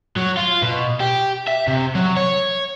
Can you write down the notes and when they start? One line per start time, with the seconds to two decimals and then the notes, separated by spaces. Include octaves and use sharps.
0.16 F#3
0.37 F4
0.62 B2
1.00 G4
1.47 E5
1.68 C3
1.95 F#3
2.17 C#5